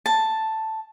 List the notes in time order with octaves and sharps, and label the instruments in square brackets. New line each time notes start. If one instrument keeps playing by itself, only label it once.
[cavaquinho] A5